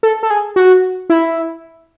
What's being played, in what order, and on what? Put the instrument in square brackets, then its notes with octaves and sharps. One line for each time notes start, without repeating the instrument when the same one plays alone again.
[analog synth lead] A4
A4
G#4
F#4
E4